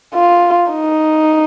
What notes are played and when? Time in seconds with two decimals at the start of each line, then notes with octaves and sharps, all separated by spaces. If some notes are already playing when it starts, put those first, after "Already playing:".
0.15 F4
0.71 D#4